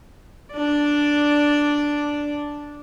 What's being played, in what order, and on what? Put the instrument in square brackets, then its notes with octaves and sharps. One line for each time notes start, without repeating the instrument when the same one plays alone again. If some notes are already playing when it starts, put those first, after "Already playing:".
[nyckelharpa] D4 D5